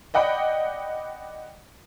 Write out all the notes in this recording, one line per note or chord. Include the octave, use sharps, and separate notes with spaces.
D5 D#5 F#5 G5 B5